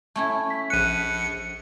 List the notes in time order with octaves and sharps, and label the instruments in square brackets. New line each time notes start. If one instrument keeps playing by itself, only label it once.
[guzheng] A3 C#4 E4
[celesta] B6
[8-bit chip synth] A#1 C#7 [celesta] F#6 D#7